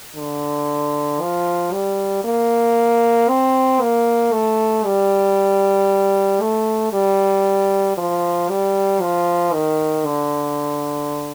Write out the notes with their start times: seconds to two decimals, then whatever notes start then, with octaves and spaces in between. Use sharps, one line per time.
0.16 D3
1.21 F3
1.72 G3
2.25 A#3
3.29 C4
3.81 A#3
4.32 A3
4.85 G3
6.41 A3
6.93 G3
7.97 F3
8.49 G3
9.01 F3
9.53 D#3
10.05 D3